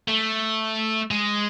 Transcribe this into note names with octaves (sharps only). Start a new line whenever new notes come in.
A3
G#3